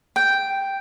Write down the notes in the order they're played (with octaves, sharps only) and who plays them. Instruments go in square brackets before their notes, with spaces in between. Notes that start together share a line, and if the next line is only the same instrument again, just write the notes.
[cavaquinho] G5